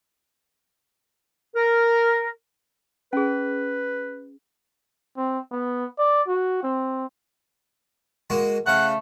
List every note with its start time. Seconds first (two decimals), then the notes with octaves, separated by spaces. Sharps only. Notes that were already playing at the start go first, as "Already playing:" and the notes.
1.55 A#4
3.13 C#4 G#4 B4
5.17 C4
5.52 B3
5.99 D5
6.28 F#4
6.63 C4
8.30 G#3 A#3 F#4
8.67 C#3 A3 F5 F#5